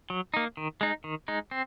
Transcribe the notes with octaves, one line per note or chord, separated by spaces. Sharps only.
F#3
A#3 D#4
D#3
G#3 D#4
D#3
G#3 D#4
C4